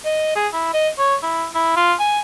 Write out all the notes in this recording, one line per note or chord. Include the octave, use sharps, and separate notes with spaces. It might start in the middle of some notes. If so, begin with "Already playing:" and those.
D#5
G#4
E4
D#5
C#5
E4
E4
F4
G#5